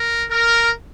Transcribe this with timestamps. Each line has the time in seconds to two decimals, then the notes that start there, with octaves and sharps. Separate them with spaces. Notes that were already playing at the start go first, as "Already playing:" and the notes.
Already playing: A#4
0.30 A#4